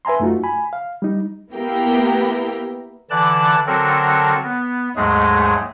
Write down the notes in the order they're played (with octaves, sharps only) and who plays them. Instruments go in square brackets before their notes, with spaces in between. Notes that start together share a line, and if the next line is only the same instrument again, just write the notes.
[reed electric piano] B4 E5 G#5 A#5 C6
F#2 A3 D#4 F4 F#4
G#5 B5
F5
G3 D#4
[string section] A#3 B3 E4 G4 A#4 G5
[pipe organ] D3 E3 D5 A5 F#6
D3 F#3 C4 F#4 A4 A#4
B3
D#2 G#2 F#3 G#3 A3 G#4